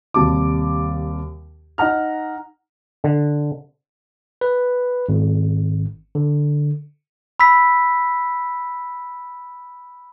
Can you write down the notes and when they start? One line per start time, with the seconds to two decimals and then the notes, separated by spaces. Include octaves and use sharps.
0.14 D#2 C3 G3 A5 D6
1.78 D#4 D#5 F#5 A#5 F6
3.04 D3
4.41 B4
5.09 G#1
6.15 D3
7.40 B5 E6 B6